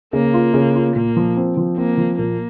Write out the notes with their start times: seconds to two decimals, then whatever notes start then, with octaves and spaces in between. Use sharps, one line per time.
0.13 C#3 A#3
0.34 F4
0.54 C#3
0.75 F4
0.96 A#2 A#3
1.17 F3
1.37 C4
1.57 F3
1.78 A#3 C4
1.98 F3
2.19 A#2 A#3